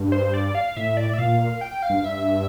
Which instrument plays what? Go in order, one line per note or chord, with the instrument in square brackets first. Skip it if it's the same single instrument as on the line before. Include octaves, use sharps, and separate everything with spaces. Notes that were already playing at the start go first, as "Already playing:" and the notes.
Already playing: [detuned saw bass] G2
[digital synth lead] C5
D5
F5
[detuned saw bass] A2 [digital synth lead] E5
[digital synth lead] D5
E5
[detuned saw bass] A#2 [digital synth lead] F5
[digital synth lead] G5
F5
[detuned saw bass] G2
[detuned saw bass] G2 [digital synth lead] E5